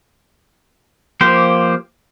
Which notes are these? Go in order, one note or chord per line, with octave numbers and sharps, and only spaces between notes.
F3 A#3 G4 C5